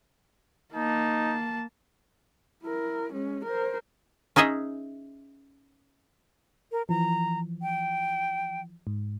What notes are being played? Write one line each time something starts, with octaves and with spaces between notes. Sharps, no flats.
A#3 D#4 A5
E4 A#4
G#3 C#4
A#4 C5
C#4 D#4 G#4 D#5 E5
A#4
E3 F3 A#5
G5
G#2